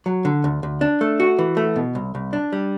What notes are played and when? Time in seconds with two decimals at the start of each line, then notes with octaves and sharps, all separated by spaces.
0.06 F#3
0.25 D3
0.44 D2
0.63 D2
0.81 D4
1.01 A3
1.20 F#4
1.39 E3
1.57 A3
1.76 B2
1.95 C2
2.15 C2
2.33 D4
2.53 G3